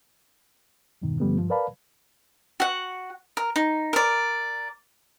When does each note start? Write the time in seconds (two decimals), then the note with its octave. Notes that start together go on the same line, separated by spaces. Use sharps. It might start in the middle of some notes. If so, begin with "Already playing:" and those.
1.02 E2 G2 B2 D#3
1.20 G2 D3 F3 G3 A3 B3
1.38 G2 F3
1.50 A#4 B4 D5 F5 A5 B5
2.60 F#4 F#5
3.37 A#4
3.56 D#4
3.93 A#4 D5